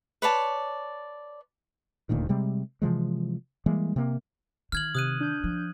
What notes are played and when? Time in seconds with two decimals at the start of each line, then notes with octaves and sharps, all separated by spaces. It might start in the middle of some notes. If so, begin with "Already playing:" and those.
0.22 B4 C#5 D5 A5
2.09 D#1 D2 A#2 D#3
2.29 C3 G3 G#3 C4
2.82 C3 E3 F3 G#3
3.66 E3 G3 G#3 A#3
3.96 C3 A#3
4.72 D#3 F6 G#6 F#7
4.95 C3 D#6 F#6 D#7
5.20 D4 G6
5.44 F3